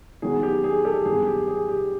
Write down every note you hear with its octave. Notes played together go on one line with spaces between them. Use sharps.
D#3 F#3 B3 G#4
G4
G#4
G4 A4
G2 D#3 F#3 B3 G#4
G4
G#4
G4